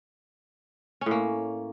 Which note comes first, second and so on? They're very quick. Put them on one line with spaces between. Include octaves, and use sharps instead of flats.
C#4 A2 A#3